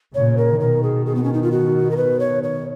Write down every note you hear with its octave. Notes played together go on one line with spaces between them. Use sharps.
A#2 C#3 C#5
A#4
B2 D#3 A#4
G#4
G#4
B3
C#4
D#4
F4
F#4
A#4
B4
C#5
C#5